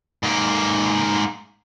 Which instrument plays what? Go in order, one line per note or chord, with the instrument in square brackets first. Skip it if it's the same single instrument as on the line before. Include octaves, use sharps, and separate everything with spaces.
[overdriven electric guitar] G#2 A#3